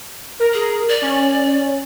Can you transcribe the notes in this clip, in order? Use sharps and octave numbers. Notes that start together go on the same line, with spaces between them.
A#4
G#4
D5
C#4